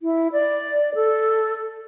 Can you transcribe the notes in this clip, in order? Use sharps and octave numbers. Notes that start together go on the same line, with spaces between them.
E4
D5
A4